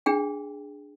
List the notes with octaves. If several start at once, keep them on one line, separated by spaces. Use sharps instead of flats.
D4 G#4 G5